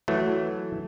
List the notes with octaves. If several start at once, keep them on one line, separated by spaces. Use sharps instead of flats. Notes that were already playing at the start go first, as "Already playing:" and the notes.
E3 F#3 A3